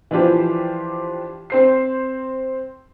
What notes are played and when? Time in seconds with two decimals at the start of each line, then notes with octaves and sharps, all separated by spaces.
0.11 E3 F3 D4 F4 G4 C5
1.50 C4 C5 C7